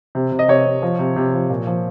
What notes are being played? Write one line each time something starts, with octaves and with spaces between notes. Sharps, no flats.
C3
C3
D#5
C3 C#5
C3
F3
C3
C3
F3
A#2
F3